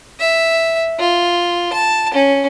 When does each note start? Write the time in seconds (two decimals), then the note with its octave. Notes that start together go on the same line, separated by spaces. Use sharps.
0.20 E5
0.99 F4
1.73 A5
2.14 C#4